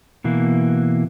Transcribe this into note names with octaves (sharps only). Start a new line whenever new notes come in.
B2 E3 A#3